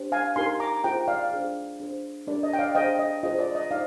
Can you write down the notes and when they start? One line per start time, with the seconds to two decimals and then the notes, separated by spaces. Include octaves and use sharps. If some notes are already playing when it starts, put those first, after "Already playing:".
Already playing: D4 G4 C5
0.12 F5 G#5
0.36 D#4 G4 A#4 G#5 C6
0.60 A#5 D6
0.84 F4 G#4 C5 G5 A#5
1.08 D5 F5
1.32 D4 G#4 C5
1.80 D4 G#4 C5
2.27 D4 G4 A#4 D5
2.43 D#5
2.53 G5
2.59 D5 F5
2.75 D4 G#4 C5 D#5 G5
2.99 D#5
3.23 F4 G#4 C5 D#5
3.39 D5
3.55 D#5
3.71 D#4 G4 C5 D5 F5